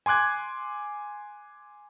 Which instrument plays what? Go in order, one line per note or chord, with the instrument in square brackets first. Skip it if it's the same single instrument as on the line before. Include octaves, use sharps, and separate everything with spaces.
[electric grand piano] G#5 C6 D6 F#6 G#6